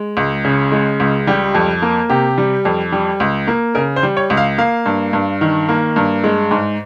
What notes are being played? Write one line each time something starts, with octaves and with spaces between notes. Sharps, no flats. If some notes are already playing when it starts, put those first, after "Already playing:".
Already playing: G#3
C#2
C#3
G#3
C#2
G3 G4
F2
A#3
C3 G4
G3
F2
G3
C#2
A#3
C#3 A#4
C5
G3
C#5
C#2
F5
A#3 F5
G2
G2
D#3
A#3
G2
G#3
G#2